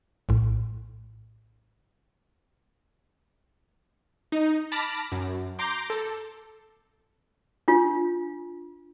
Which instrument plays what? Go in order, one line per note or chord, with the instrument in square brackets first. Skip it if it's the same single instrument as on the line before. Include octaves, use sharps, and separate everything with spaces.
[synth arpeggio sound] A#1 A2
[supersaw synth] D#4
A5 B5 D6 F6 A#6
F#2
A#5 C6 D6 G6
A4
[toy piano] D4 F4